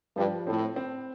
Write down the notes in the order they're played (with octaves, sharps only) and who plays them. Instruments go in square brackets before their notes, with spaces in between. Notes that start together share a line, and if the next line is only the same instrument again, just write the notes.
[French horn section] G2 [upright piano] F3
[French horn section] A2 [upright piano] C4
[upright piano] C4